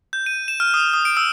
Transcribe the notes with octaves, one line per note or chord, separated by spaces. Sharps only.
G6
D#7
E7
F6
D#6
D#6
D7
E6